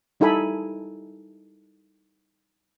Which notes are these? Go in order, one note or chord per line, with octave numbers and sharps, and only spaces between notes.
G3 D#4 E4 A4 G#5 B5